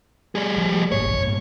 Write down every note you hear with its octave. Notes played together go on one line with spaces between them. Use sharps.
G3 G#4
F3
G1 G#2 A#3 C#5
B1 G2
G2 A#2